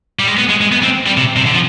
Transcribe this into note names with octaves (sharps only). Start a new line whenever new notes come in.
G3
G#3
B3
G#3
G#3
B3
C4
G3
C3
C3
D3
F3